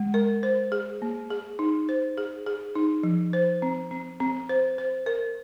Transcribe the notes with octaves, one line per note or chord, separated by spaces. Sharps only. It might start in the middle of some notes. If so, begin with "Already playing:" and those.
Already playing: G#3
A#4
C5
G#4
A#3
G#4
D#4
C5
G#4
G#4
D#4
F3
C5
C4
C4
C4
C5
C5
A#4